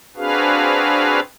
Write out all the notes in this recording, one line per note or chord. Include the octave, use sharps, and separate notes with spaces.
C4 D4 F#4 G#4 B4 F5